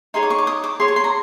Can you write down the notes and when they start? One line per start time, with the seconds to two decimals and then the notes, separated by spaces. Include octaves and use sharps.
0.14 D#4 G#4 C#5 C6
0.23 D6
0.30 C#6
0.38 D6
0.47 D#6
0.64 D6
0.80 G#4 C#5 C6
0.88 C#6
0.96 C6
1.04 A#5